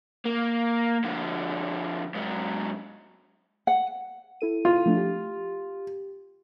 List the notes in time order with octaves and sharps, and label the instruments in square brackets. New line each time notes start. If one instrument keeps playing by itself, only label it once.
[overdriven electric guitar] A#3
D3 F3
G#2 F#3
[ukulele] F#5
[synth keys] E4 A4 D#7
[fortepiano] F4
[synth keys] F3 A3 D4
G4